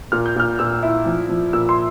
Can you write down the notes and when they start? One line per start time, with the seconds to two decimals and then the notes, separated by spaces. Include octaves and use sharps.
0.12 A#2 F6
0.26 G6
0.36 A#2 F6
0.59 A#2 E6
0.83 E4
1.06 F3
1.29 F3
1.53 A#2 E6
1.69 C6